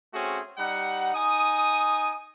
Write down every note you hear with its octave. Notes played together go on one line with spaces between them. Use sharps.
A3 C4 C#4 F#4 G#4
G3 D#4 F#5
D#4 G#5 D#6